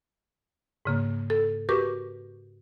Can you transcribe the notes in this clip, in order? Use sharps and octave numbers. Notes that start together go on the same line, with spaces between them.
G#2 C#3 A#3
A4
F#4 G4 A#4 B4 C#6 D6